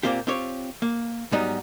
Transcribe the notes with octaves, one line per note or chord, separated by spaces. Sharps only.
A#2 A#3 C4 F4 G4
C4 F4 G4 C#5
A#3
G#2 F#3 G3 B3 D#4